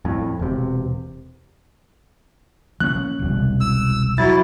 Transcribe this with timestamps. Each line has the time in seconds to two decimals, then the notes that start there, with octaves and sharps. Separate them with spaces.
0.05 F2 A2
0.39 E1 C3
2.80 F3 A#3 C#4 F#6
3.19 E1 C2
3.61 E6
4.18 F#3 E4 A6